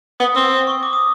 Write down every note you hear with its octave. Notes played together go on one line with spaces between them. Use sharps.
B3 D#6
C4 E6
C#6
D6
D#6